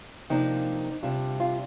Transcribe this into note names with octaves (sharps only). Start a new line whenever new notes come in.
C3 F3 A#3 D4 D#4
C3 G3 D4 F4
F4